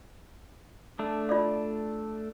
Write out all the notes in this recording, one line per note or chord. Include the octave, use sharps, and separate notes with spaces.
A3 D4
F4 D5 F5